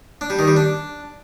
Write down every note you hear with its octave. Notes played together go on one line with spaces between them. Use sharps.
D4
G3
D#3
G3
D4